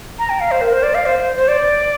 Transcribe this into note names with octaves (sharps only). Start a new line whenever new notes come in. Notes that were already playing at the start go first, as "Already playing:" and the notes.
A#5
G5
F5
C5
A#4
C5
D5
F5
C5
C5
D5